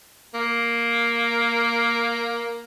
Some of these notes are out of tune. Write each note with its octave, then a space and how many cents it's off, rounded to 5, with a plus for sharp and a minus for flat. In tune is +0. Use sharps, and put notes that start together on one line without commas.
A#3 +5